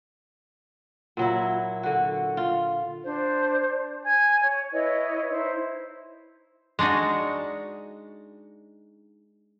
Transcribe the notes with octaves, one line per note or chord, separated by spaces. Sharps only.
A#2 F#3 E4
D3 F#4
F4
D4 C5
G#5 G#6
C#5
E4 B4 C#5 D#5
D#4 E4 C5
G#3 D4 D#4 F#4